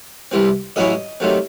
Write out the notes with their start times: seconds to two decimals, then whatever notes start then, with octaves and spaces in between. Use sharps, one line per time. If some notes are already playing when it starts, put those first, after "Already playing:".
0.31 C2 C3 E3 C4
0.76 A1 A2 F#3 C#4 E4 D#5
1.20 C3 D#3 F#3 A3 C4